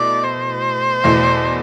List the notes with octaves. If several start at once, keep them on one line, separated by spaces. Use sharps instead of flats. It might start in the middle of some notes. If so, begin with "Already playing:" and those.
Already playing: B2 A3 E4 D5
C5
E2 B2 A3 E4